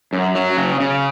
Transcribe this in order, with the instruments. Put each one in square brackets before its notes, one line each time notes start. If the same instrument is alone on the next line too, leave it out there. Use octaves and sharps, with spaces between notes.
[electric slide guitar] F#2
F#3
C#3
C#3